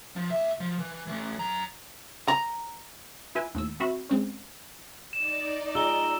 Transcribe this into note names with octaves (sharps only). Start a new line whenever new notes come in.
F3
D2 E5
F3
E3
E3 A3
F#2 A#5
A#5
E4 F4 B4 E5 G#5
D#2 A2 E6
C4 F#4 E5 B5
G#3 C4 C#4
D#4 D5 E7
F4 G#4 D#5 A#5 E6 G7